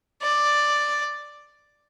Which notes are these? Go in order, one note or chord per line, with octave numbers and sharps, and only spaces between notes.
D5